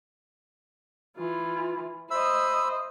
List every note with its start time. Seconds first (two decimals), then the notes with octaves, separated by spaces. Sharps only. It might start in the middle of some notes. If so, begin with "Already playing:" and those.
1.16 E3 F4
2.11 C5 D#5 E5 B5 E6